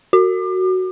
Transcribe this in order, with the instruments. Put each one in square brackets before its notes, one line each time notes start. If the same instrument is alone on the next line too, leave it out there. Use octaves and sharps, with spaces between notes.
[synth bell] F#4